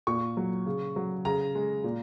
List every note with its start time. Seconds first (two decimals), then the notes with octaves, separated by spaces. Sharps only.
0.07 A#2 C#6
0.37 F#3
0.66 C#3
0.96 F#3
1.25 C#3 A#5
1.55 G#3
1.84 A#2